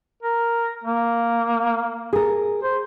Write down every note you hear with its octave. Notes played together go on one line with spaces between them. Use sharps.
A#4
A#3
G#4 A#4
C5